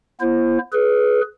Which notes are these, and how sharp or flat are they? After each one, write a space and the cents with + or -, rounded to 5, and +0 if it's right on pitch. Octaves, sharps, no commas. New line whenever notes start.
B3 -35 E4 +35 C5 +25
G#4 +25 B4 +0